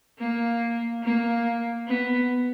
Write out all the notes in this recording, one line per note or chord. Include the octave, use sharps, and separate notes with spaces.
A#3
A#3
B3